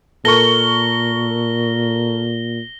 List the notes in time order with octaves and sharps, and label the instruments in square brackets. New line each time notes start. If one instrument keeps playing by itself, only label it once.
[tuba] A#2 [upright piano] A4 A#4 C#6 [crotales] A#6 G7